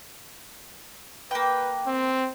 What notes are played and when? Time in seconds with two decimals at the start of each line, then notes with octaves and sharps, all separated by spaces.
1.31 A#3 B4 G5
1.87 C4